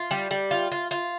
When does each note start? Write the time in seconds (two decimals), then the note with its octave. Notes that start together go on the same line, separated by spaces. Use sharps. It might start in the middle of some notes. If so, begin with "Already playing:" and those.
Already playing: F4
0.11 G3
0.31 G3
0.51 F4
0.72 F4
0.91 F4